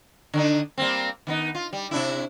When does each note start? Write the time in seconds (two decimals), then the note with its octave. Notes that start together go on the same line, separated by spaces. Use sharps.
0.34 D3 D4 D#4
0.78 G3 A#3 C4
1.27 D#3 B3 D#4
1.55 F4
1.73 G3
1.91 C3 D4 E4